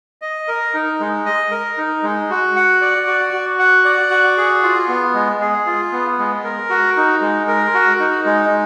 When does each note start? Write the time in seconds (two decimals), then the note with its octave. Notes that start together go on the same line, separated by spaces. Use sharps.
0.22 D#5
0.48 A#4
0.74 D#4
1.00 G#3
1.26 D#5
1.51 A#4
1.78 D#4
2.03 G#3
2.30 F#4
2.56 F#5
2.81 D5
3.07 F#4
3.33 F#4
3.59 F#5
3.85 D5
4.10 F#4
4.37 G#4
4.63 F4
4.88 B3
5.14 G#3
5.41 G#4
5.66 F4
5.93 B3
6.19 G#3
6.44 A#4
6.70 F#4
6.97 D#4
7.21 G#3
7.48 A#4
7.74 F#4
7.99 D#4
8.26 G#3